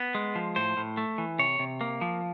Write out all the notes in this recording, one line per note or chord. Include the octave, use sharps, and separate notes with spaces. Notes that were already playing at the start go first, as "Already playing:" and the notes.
Already playing: B3
G#3
F3
A2 C5
A2
A3
E3
C3 C#5
C3
A#3
F3